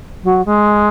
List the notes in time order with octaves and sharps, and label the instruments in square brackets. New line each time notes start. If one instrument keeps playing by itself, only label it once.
[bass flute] F#3
G#3